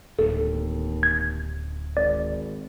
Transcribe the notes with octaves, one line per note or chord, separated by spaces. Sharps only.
D1 D#2 A4
G#6
G#1 D5